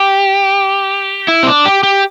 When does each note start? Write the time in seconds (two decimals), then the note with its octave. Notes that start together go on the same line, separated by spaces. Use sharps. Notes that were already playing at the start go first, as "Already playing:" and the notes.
Already playing: G4
1.28 E4
1.43 C4
1.47 D4
1.66 G4
1.83 G4